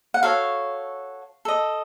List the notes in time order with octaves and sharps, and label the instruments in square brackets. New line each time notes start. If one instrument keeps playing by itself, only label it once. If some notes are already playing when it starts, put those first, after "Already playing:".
[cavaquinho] F#5
F#4 A4 C#5 F5
A4 D#5